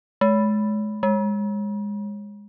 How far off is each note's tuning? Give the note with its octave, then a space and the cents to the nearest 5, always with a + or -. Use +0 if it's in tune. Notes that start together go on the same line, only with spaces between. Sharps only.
G#3 +30
G#3 -20